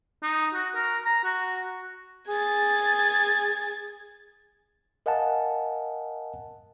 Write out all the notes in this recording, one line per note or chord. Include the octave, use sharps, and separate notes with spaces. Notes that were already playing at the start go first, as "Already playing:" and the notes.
D#4
F#4
A#4
A#5
F#4
G#4 G#6 A6
A#4 D#5 F5 F#5 G#5 A5